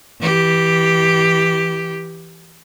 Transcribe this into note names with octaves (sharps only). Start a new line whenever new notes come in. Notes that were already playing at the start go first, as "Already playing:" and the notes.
E3 G4